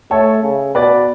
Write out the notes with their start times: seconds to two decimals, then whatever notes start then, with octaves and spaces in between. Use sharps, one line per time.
0.11 A3 A4 C#5
0.43 C#3
0.75 B2 B4 D5